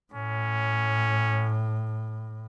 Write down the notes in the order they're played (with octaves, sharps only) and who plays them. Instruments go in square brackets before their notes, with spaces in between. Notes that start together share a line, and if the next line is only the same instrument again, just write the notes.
[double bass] A2 [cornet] C#4